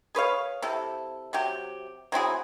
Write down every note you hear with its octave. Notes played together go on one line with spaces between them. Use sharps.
G#4 B4 C#5 F5
C3 E4 A4
C3 F#3 G4
F#3 C4 E4 G#4